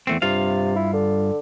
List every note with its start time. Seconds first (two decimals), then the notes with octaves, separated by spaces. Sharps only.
0.07 E2 A3 C4
0.22 G2 C3 F4 F5
0.76 E4
0.93 D3